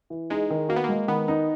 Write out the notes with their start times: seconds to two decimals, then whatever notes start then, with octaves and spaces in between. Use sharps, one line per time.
0.10 E3
0.30 G#3 D#4
0.50 D#3
0.69 A#3 F#4
0.76 B3
0.84 G#3 A#3
1.08 D#3 B3
1.28 D#4